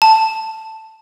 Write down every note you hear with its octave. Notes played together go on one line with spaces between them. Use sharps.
A5